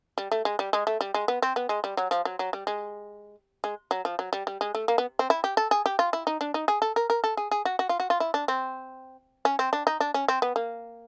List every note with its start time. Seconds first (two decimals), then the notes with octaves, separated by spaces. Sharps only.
0.18 G3
0.32 A3
0.45 G#3
0.59 G3
0.73 G#3
0.87 A3
1.01 G3
1.14 G#3
1.28 B3
1.42 C4
1.56 B3
1.69 G#3
1.84 G3
1.97 F#3
2.11 F3
2.25 F#3
2.39 F#3
2.53 G3
2.67 G#3
3.64 G#3
3.91 F#3
4.05 F3
4.19 F#3
4.33 G3
4.47 G3
4.61 G#3
4.75 A3
4.88 A#3
4.98 B3
5.19 C4
5.30 E4
5.44 G4
5.57 A4
5.71 G#4
5.86 G4
5.99 F4
6.13 E4
6.27 D#4
6.41 D4
6.54 D#4
6.68 G#4
6.82 A4
6.96 A#4
7.10 A#4
7.24 A4
7.37 G#4
7.51 G#4
7.65 F#4
7.79 F#4
7.89 F4
8.00 F#4
8.10 F4
8.20 E4
8.34 D4
8.48 C4
9.45 C#4
9.59 C4
9.73 D4
9.87 D#4
10.00 D4
10.14 C#4
10.28 C4
10.42 B3
10.56 A#3